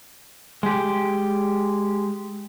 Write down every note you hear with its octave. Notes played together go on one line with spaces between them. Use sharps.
G#3 G4